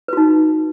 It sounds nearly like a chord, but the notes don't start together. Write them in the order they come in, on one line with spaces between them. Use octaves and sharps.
B4 F#4 D#4